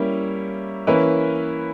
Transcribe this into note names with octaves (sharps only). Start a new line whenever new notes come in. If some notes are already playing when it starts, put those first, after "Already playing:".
Already playing: G3 A#3 C#4 E4
E3 A#3 C#4 E4 B4